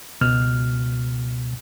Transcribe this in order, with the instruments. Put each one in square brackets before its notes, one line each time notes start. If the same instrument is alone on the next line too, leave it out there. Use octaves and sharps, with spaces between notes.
[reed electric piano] C#2 B2 F6